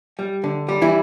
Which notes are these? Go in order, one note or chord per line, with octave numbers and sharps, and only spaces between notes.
G3
D3
G3
E3 E4